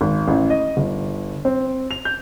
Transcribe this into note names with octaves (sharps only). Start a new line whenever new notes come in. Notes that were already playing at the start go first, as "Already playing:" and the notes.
G#1
A1
D#5
G1
C4
F7
G6